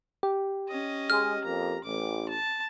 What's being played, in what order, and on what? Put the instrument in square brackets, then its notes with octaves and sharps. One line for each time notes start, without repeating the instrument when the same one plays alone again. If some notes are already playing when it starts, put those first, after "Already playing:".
[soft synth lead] G4
[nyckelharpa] C#4 D#5
[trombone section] G#3 [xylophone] F6
[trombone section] F2 A#3 [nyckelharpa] A#5
[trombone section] A1 [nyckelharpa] D6
[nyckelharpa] A5